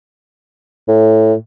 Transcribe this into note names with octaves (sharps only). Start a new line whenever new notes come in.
A2